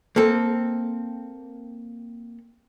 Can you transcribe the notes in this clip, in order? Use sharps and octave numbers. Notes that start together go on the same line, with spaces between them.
A#3 C4 A4